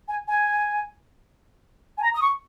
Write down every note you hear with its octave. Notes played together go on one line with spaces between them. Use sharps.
G#5
G#5
G#5
A#5
D#6
C#6